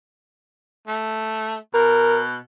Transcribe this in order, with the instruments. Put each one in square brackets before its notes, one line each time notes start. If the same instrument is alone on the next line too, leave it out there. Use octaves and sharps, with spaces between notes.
[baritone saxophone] A3
[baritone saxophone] B2 [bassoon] A#4